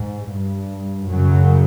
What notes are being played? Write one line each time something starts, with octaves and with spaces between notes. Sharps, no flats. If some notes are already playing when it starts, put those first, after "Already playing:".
Already playing: G#2
G2
F#2 C#3 F#3